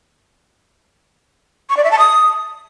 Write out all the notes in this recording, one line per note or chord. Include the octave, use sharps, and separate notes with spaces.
C#6
D5
E5
A5
D#6